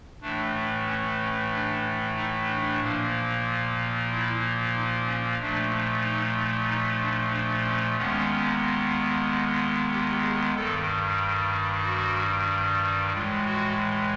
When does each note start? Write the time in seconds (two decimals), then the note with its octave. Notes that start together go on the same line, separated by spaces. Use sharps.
0.22 A2 E3 A3 D4
0.87 C#4
1.19 C#4
1.51 D4
2.16 D#4
2.48 D4
2.80 A#2 F3 A#3
4.09 E4
4.74 D#4
5.06 C#4
5.38 A#2 F3 A3 D4
6.03 D#4
6.68 D#4
6.99 D4
7.32 D4
7.64 C#4
7.96 D#2 D#3 G#3 B3 C#4
9.90 G4
10.22 G#4
10.54 G2 D#3 G3 A4
11.83 F#4
13.13 A2 E3 G#3 F4
13.45 F#4